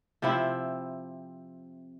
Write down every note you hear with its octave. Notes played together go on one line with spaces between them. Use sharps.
C3 F3 C4 E4